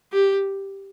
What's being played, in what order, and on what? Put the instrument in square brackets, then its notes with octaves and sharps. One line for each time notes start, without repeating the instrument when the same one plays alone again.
[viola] G4